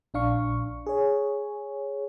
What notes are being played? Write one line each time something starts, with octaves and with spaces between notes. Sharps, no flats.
A#1 D4 F5 C#6
G#4 C#5